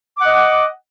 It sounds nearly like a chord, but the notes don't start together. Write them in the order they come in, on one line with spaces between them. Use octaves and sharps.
D6 F#5 D#5